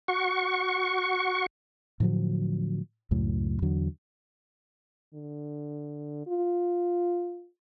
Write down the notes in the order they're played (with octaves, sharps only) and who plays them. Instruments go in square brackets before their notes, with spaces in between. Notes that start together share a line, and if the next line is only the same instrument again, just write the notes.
[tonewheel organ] F#4 C#6
[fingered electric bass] A2 D3 F3 F#3
C#2 F#2 A2
E2 D3 F#3
[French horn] D3
F4